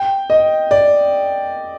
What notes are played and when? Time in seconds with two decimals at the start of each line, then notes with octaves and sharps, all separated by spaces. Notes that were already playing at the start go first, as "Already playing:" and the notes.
Already playing: G5
0.30 D#5
0.71 D5